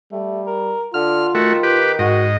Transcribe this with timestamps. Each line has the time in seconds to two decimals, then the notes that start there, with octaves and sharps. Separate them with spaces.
0.12 G3 A3
0.47 A#4
0.94 D3 F4 F6
1.35 D#3 A3 F#4
1.63 G4 B4
1.99 G#2 F#4 D#5